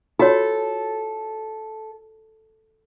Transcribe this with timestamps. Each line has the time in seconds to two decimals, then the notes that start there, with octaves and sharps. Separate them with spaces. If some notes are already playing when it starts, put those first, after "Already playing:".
0.19 F4 F#4 A4 C#5